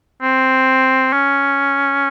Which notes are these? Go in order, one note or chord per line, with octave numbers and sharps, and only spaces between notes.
C4
C#4